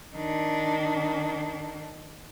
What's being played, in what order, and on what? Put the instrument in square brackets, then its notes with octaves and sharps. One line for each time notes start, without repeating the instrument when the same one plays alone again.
[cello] D#3 D4